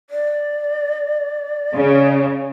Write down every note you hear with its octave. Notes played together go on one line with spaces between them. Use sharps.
D5
C#3